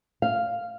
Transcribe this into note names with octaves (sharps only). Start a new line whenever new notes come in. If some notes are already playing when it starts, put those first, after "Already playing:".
F5